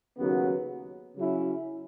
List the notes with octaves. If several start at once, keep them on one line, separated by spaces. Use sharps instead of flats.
D#2 C#3 F#3 B3
C#3 F#3 C#4 E4